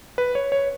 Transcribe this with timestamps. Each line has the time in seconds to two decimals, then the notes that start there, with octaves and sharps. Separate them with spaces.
0.18 B4
0.35 C#5
0.52 C#5